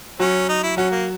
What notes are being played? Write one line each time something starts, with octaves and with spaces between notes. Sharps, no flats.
F#3 C#4 F#4
D#4
E4
F#3 C#4 F#4
A#3